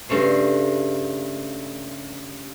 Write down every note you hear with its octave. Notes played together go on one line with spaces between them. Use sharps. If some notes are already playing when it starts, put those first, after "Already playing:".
G2 C#3 A3 C5